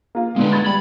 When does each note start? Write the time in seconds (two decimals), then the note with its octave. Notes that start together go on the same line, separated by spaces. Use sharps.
0.15 A#3 F4
0.36 B2 D3 G#3 B3
0.52 B5 G#6 A6
0.66 G3 B5